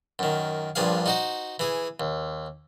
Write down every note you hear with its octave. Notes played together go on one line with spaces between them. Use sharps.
F#2 D#3
A#1 G2 F3 G#4 F5
D#4 F#4 C5
E3 G#4
D#2